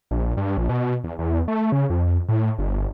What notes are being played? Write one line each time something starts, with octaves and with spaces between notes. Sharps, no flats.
A#1
G2
A#1
B2
E2
E2
A3
C#3
F2
A2
G1